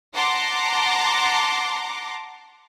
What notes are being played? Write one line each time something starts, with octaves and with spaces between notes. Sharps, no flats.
F#5 A5 A#5 C6 D6